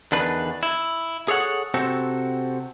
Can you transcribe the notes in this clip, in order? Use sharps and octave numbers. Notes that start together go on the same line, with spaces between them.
E2 D3 D#3 D4 B4
E4
G#4 A4 C#5 F5 F#5
C3 C4 F#4 A4